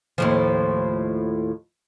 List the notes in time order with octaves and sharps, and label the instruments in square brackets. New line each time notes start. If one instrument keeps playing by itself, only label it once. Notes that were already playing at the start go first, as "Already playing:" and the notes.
[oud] D#2 A2 F3